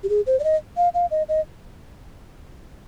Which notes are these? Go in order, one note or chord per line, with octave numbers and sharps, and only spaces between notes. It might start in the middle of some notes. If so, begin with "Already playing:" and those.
G4
G#4
C5
D5
D#5
F5
F5
D#5
D#5